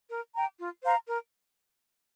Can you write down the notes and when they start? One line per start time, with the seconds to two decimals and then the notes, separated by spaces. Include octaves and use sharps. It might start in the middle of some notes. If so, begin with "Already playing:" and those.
0.11 A#4
0.35 G5 A#5
0.59 F4
0.83 C5 F5 A#5
1.07 A#4